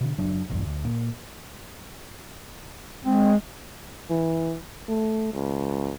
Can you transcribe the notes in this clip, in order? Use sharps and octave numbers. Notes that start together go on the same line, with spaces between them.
B2 D3
F#1 F#3 D4
F#1 B1 E2 G2
D2
A#2
G#3 C4
E3
A3
C#2